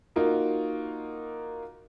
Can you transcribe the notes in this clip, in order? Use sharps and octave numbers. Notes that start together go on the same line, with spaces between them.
A#3 D#4 F4 F#4